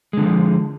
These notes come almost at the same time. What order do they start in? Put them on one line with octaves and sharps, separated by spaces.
G#3 D3 E3 F3